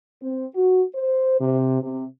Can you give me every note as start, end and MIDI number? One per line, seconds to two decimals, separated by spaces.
0.23 0.47 60
0.55 0.83 66
0.95 1.39 72
1.40 1.81 48
1.82 2.04 48